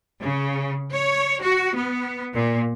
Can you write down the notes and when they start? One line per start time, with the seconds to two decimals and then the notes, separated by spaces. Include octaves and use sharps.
0.23 C#3
0.93 C#5
1.42 F#4
1.76 B3
2.34 A#2